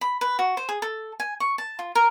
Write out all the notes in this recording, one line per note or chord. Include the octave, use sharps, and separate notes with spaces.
B5
B4
F#4
C5
G#4
A4
G#5
C#6
A5
F4
A#4